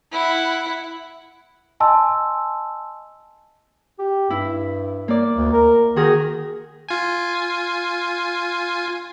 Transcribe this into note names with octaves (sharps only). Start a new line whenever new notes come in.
E4 F#5
D#5 G#5 A5 C6 E6
G4
G2 E4
A#3 D5
D2
A#4
D#3 F#4 G#4 A#4
F4 G#5